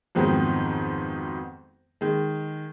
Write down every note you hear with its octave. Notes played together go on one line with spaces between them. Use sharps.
F2 G#2 D#3 F#3 B3 C4
D#3 G#3